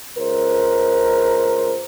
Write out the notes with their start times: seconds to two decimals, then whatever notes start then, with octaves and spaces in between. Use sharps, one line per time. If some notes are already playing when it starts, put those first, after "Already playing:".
0.18 C#2 A#4 C5